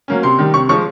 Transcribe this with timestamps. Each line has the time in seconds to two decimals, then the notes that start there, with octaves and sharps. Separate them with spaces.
0.08 F#3 A#3 C#4
0.23 C3 C6
0.39 D#3 G3
0.54 C3 C#6
0.69 F3 G#3 C#6